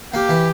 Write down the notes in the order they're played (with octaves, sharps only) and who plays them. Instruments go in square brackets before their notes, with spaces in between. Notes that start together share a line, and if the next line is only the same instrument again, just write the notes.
[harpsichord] A#3 [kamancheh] G4
[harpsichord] E3